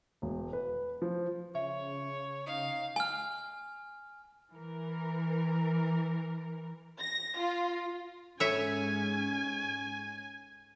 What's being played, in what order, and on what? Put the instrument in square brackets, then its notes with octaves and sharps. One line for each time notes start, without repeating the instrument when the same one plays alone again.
[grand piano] E1
B4
F3
[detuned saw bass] C#3 [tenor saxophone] C#5 [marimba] E5
[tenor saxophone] D#4 [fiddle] F5
[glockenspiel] G#5 F6
[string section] E3 A#4
A#6
F4
[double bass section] G#2 G#3 C#4 [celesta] A4 E6 [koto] C#5 E5 [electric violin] G#5